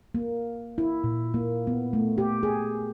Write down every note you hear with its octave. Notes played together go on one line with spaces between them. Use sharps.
A#3
E4
A#2
A#3
B3
A3
G4
G#4